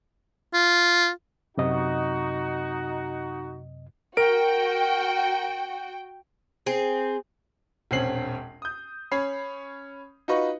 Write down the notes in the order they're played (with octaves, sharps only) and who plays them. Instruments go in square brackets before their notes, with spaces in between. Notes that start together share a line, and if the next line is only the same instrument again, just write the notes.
[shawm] F4
[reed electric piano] F#2 C3 D#5 [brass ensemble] D#4 F#4
[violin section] F#4 G5 [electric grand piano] A#4 D7
[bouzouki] C4 G#4
[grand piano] E1 A#1 C4 C#4 C7 F#7
D#6 G6
C#4 C#5 B5 C7
D#4 F4 F#4 B4 D#5 C#6